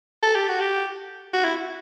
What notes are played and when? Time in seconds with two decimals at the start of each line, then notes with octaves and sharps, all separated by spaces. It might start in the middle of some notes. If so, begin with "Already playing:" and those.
0.23 A4
0.35 G4
0.48 F#4
0.60 G4
1.33 F#4
1.44 E4